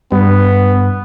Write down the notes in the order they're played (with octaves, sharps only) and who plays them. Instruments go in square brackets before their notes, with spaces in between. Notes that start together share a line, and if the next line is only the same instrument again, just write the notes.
[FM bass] G2 [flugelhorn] B3